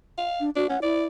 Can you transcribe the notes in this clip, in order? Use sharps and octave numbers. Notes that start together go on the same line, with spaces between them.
F5
D4
D4 F#4
C#4 F#5
E4 D5